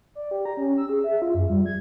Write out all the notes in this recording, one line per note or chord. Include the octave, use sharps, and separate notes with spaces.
D5
G4
A#5
C#4
E6
G#4
E5
F4
F#2
G3
G#6